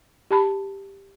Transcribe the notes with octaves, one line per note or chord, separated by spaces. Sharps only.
G4 A5 B5